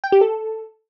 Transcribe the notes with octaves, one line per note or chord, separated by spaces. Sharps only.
G5
G4
A4